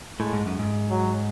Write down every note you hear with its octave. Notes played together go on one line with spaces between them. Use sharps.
A2 G#3
G#2
F#2
G#2
F#3